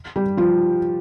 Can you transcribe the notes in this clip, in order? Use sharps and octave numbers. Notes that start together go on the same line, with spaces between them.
G3 G4
F3 F4